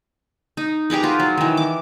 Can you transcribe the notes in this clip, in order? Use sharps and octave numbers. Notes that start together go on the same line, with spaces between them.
D#4
G4 G#4 A#4 B4
F4 F#4
F#3
D#3 E3
D6